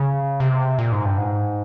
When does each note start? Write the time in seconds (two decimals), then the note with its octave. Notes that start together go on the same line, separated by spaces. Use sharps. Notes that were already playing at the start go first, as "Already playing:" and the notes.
Already playing: C#3
0.40 C3
0.79 A#2
0.92 G#2
1.05 G2
1.17 G#2